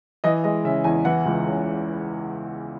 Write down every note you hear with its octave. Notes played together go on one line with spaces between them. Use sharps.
E3 D#5
G#3 D#5
C#3 E5
E2 G#5
E3 F#5
C#2
C#3